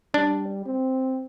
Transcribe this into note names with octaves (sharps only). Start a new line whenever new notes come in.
G3 D4
C4